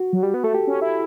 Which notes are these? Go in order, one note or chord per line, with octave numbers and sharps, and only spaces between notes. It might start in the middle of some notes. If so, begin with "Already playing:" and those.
Already playing: F#4
F#3
G3
B3
A3 A4
G4
C#4
E4